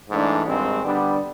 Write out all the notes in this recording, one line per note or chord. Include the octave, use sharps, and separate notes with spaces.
G#2 E3 A3 D4
G#1 G2 D#3 G#3 C4
D3 G3 B3 D4